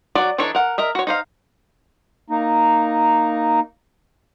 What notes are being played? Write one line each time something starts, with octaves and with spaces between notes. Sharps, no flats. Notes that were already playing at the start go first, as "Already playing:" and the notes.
F#3 F#4 D5
E3 D4 D#4 A4 C#5
A#4 F#5
A#4 D#5 E5
F#4 C#5
D#4 C5 F5
A#3 D#4